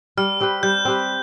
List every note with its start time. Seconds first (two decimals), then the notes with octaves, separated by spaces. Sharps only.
0.17 G3 F6
0.40 C4 G4 B4
0.63 G3 G6
0.85 C4 G4 B4